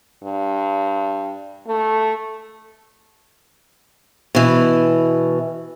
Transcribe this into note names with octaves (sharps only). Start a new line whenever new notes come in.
G2
A3
B2 E3